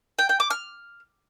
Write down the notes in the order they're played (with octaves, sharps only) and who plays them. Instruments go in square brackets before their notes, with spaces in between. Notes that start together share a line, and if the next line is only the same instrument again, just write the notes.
[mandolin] G5
G5
D6
F6